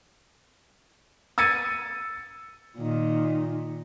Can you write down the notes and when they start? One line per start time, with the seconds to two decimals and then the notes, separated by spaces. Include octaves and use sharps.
1.38 E6 G#6 A6 C#7 D#7
2.77 A#2 D#3